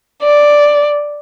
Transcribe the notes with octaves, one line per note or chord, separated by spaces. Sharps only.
D5